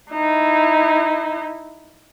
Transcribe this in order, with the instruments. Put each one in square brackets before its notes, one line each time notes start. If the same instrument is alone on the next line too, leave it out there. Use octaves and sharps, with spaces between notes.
[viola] D#4 E4